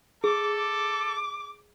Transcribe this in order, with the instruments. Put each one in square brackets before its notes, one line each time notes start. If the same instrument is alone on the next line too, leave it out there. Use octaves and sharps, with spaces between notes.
[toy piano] G#4 [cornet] A4 [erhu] D6
[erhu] D6